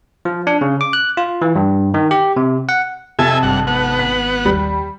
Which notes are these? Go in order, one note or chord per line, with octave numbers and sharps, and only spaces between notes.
F3
D4
C#3
D6
F#6
F4
E3
G2
D#3
G4
C3
F#5
F2 C3 A4 E5 G#5
G#1 G2 F#5
B3 F#5
B6
D#2 G3